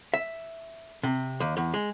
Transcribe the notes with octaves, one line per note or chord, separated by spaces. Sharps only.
E5
C3
D#2
E2
G#3